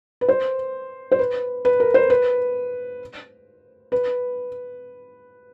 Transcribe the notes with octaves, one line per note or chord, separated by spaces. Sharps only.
B4
C5
C5
B4
B4
A#4
C5
B4
B4